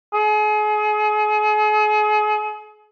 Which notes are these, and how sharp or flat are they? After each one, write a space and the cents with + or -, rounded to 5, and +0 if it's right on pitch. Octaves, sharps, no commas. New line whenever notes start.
G#4 +35